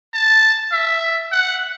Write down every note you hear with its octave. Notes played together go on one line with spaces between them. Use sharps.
A5
E5
F#5